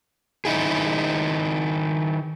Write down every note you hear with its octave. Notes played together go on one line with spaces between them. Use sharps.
D#3 D#4 E4 G#4